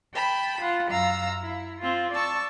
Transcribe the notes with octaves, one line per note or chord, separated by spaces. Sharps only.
G5 A5 B5
F4 F#5
F#2 F5 A#5 E6
E4
C4 F4
D5 A5 C#6 E6